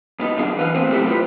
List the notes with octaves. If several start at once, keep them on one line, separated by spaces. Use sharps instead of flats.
G2 B3 D4 D#4
F#2 D3 D4 G#4 F5
E3 B4 F5
A2 B3 C4 C5
C3 F#3 A3 E4 G4 A4
F4 G4 B4